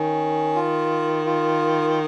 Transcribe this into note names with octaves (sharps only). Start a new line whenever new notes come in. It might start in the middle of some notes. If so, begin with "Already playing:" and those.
Already playing: D#3 C#4
F4
F4